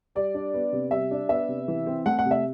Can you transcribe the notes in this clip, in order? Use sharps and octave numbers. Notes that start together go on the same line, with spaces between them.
G3 D5
D4
B3
C3
G3 E5
D4
B3 E5
C3
E3
C4
A3 F#5
F#5
C3
E5